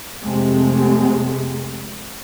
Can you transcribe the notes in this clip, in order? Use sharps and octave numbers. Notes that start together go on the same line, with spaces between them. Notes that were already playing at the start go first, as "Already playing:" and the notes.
F2 C3 G#3 A3 C4